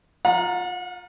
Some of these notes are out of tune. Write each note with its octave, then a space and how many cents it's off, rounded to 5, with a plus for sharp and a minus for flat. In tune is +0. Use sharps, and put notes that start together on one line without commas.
F4 +20 F#5 -35 A#5 +0